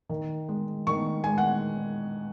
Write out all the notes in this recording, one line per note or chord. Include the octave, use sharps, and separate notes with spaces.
D#3
G#3
D#3 C#6
G#3 G#5
F#5